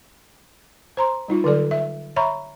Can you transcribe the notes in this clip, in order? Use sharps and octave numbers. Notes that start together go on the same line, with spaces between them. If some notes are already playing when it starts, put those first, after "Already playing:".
C5 A#5 C6
G3 D#4 F4
D3 F#3 A4 D5
E5
C#5 E5 A#5 B5 C#6